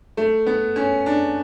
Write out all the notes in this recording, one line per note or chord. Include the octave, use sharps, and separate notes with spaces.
A3
B3
C#4
D4